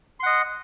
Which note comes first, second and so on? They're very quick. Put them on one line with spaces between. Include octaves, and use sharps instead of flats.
C6 F#5 D#5